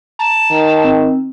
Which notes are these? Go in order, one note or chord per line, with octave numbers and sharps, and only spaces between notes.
A5 A#5
D#3
C4